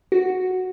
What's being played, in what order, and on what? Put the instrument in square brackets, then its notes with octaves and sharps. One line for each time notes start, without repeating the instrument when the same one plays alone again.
[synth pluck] F#4